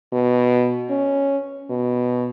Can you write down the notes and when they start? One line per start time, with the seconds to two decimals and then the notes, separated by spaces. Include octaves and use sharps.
0.12 B2
0.89 C#4
1.70 B2